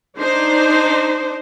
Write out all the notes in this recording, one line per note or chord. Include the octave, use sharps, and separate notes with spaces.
D4 D#4 C5